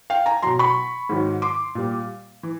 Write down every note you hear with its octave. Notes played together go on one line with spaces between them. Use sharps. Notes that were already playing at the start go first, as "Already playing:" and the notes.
F5 G5
G#5 A#5
B2 F#3 A#5 C6
B5 C#6
G#2 D#3 F#3
C6 D6
A#2 G3
E3